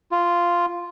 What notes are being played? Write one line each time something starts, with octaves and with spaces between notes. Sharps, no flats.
F4